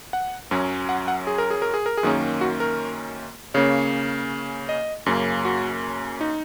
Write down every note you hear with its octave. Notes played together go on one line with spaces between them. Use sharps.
F#5
F#2 F#3 C#4
F#5
F#5
G#4
A#4
G#4
A#4
G#4
A#4
G#4
F#2 D#3 A#3 C#4
F#4
A#4
C#3 A#3 C#4 C#5
D#5
F#2 C#3 A#3 C#4
F#4
D#4